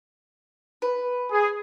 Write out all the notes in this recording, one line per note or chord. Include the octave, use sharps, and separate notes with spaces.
B4
G#4